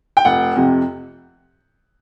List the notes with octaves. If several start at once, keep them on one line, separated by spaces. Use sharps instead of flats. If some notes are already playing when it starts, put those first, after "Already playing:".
G5
F1 F#5
F2 C3